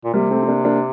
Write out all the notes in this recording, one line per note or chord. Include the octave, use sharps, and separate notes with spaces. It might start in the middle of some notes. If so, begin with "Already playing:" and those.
A#2
C3 G3 A#3
A3 C4
C4
A#3 D4
A#3 D4